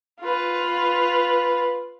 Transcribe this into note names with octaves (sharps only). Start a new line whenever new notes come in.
F4 B4